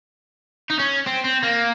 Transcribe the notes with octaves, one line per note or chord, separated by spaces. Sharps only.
D#4
C#4
C4
C4
A#3